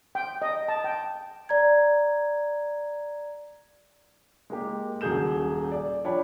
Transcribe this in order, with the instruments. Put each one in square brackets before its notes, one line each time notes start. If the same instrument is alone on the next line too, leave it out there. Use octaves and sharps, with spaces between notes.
[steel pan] G5
D#5
A5
G5
[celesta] D5 A#5 G#6
[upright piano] G#3 A#3 G4
D#1 F#2 F#4 G#4 G6 E7
D5
F3 D4 C#5 G5 B5